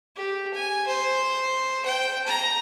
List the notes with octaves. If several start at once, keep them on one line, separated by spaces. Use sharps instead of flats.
G4
G#5
C5
G5
A#5